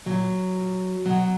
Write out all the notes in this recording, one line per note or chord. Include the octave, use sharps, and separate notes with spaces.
A#2 F#3
A#2
B2 F#3